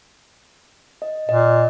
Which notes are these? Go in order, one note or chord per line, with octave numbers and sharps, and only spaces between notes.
D#5
A#2 D#5